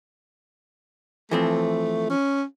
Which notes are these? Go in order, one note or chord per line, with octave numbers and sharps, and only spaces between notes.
E3 F3 A3 C4
C#4